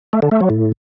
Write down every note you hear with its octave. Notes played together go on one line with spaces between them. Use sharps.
A3
D3
A3
F#3
A2